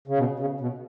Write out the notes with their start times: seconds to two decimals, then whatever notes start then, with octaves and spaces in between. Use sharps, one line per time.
0.08 C#3
0.18 B2
0.39 C#3
0.61 B2